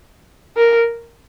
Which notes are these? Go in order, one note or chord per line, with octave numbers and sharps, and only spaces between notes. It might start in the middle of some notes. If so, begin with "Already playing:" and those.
A#4